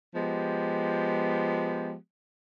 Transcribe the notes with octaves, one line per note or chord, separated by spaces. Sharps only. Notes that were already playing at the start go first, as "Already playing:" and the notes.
F3 G#3 B3 G4